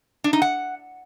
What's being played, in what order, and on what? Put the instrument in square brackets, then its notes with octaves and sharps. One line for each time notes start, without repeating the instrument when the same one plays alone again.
[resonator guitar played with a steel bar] D4
D#4
F#5